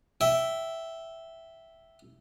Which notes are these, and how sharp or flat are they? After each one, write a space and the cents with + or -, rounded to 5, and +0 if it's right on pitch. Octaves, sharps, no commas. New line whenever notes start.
E5 +0 G5 -20